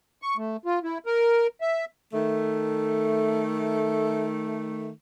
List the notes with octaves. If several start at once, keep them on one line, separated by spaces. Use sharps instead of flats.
C#6
A3
F4
E4
A#4
E5
D#3 A3